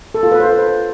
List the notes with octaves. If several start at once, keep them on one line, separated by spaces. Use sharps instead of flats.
A4
F4
B4
C5